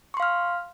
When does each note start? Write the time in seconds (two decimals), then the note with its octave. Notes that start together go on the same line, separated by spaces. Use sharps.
0.14 C#6
0.17 C6
0.20 F5
0.22 F6